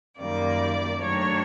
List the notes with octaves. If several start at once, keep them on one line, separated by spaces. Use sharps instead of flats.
F#2 D#3 G3 A#3 D5
G2 D#3 F#3 A3 D4 C#5